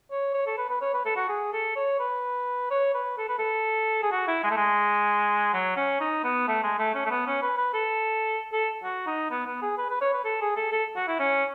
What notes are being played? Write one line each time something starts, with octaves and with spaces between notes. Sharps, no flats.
C#5
C#5
A4
B4
B4
C#5
B4
A4
F#4
G#4
A4
C#5
B4
C#5
B4
A4
B4
A4
G#4
F#4
E4
G#3
A3
G#3
F#3
C#4
D#4
B3
A3
G#3
A3
C#4
A3
B3
C#4
B4
B4
A4
A4
F#4
D#4
B3
B3
G#4
B4
B4
C#5
B4
A4
G#4
A4
A4
F#4
E4
C#4